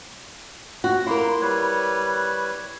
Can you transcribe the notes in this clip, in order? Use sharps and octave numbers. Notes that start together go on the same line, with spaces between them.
F#4
A#3 E4 A#4 C6
G3 B4 C#5